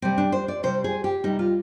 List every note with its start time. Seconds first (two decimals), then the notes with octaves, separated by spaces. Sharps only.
0.02 C3 G3 C4
0.18 D4
0.32 C5
0.48 D5
0.63 C3 G3 C5
0.84 G#4
1.04 G4
1.24 C3 G3 D#4
1.39 F4